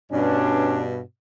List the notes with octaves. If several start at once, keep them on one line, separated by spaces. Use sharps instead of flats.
G2 B2 C#4 D4